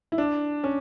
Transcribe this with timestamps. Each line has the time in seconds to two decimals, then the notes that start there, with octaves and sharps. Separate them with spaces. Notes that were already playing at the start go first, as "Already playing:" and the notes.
0.12 E4
0.18 D4
0.64 C#4